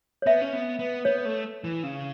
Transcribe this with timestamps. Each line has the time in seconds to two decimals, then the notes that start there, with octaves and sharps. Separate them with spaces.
0.22 C#5
0.26 B3 E5
0.42 C#4
0.53 B3
0.79 B3
1.05 B3 C#5
1.25 A3
1.64 E3
1.83 C#3